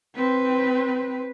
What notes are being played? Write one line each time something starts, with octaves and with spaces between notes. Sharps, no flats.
C4 B4